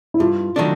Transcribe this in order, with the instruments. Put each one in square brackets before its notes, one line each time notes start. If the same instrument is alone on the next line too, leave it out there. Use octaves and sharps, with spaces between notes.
[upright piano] E4
[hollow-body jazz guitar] G2 [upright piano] F4
[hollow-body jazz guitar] D#3 F#3 A3 D4